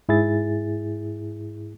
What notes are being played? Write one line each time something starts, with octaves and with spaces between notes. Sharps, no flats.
G#2 E4 G#4 A6